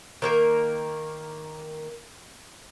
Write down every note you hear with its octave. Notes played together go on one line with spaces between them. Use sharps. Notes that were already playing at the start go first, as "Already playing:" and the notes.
D#3 A#3 A#4